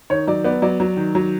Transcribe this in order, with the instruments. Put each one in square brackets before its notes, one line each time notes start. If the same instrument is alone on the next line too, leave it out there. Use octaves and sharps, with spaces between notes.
[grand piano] D#3 [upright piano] C#5
[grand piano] F#3 [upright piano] D5
[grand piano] B3 [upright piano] D5
[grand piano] F#3 [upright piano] D5
[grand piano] F#3
D#3
F#3